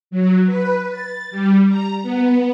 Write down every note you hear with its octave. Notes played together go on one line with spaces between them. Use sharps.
F#3
B4
A6
G3
A#5
B3